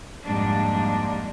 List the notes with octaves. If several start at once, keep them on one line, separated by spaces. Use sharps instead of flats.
F2 G#2 G3 G#3 A#3 D4